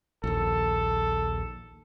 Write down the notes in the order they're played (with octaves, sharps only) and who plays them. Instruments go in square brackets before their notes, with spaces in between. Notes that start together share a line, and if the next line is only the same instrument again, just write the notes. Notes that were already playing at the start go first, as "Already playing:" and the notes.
[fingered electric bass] A#1 D#2 [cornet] A4